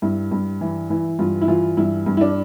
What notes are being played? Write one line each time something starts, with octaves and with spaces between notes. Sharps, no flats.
G2 E4
G2
E3
E3 E4
G2 F4
E4
E3 F4
G2 E4
G2
E4
D4